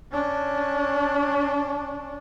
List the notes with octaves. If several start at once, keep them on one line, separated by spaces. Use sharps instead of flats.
C#4 D4